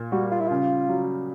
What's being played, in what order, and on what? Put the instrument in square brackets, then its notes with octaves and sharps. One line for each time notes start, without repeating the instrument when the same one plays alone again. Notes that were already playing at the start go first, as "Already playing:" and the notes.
Already playing: [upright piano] A#2
[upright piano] G3 [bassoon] F#4
[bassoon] F4
E4
[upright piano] C#3 [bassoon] F4
[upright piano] F#3